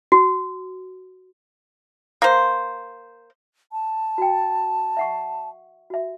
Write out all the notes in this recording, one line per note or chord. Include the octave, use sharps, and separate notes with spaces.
F#4
A#3 C5
A5
F#4 G5
E5 F#5 C#6
F#4 E5